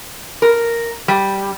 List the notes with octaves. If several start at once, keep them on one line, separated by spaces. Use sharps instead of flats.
A#4
G3